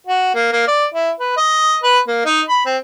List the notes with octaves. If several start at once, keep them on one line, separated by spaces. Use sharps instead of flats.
F#4
A#3
A#3
D5
E4
B4
D#5
B4
A#3
D#4
B5
C4